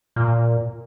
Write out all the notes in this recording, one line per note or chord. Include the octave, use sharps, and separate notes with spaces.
A#2